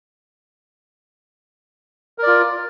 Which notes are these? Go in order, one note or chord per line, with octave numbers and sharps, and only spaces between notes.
F4 A#4 D5